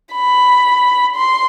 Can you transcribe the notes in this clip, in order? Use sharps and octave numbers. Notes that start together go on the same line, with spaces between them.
B5
C6